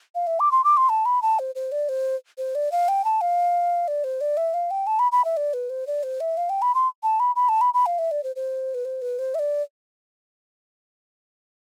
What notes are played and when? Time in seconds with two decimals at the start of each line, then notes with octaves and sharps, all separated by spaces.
0.15 F5
0.27 E5
0.40 D6
0.51 C6
0.64 D6
0.77 C6
0.89 A5
1.05 B5
1.22 A5
1.39 C5
1.55 C5
1.72 D5
1.89 C5
2.38 C5
2.55 D5
2.72 F5
2.88 G5
3.05 A5
3.21 F5
3.88 D5
4.04 C5
4.21 D5
4.37 E5
4.54 F5
4.71 G5
4.87 A5
4.99 B5
5.12 B5
5.25 E5
5.37 D5
5.53 B4
5.70 C5
5.87 D5
6.03 C5
6.20 E5
6.37 F5
6.49 G5
6.62 B5
6.75 C6
7.03 A5
7.20 B5
7.36 B5
7.49 A5
7.61 B5
7.74 B5
7.86 F5
7.98 E5
8.11 D5
8.24 C5
8.36 C5
8.74 B4
8.85 C5
9.02 B4
9.19 C5
9.35 E5
9.39 D5